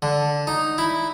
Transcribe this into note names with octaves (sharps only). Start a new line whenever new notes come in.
D3
D#4
E4